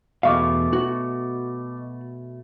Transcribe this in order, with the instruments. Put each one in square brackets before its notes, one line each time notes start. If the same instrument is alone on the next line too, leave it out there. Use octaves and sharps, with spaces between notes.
[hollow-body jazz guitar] E2 F5 [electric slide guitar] B2 A3 [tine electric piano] D#5 C#6 D6
[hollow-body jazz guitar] F#4